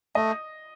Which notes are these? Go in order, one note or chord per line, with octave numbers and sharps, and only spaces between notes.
A3 D#5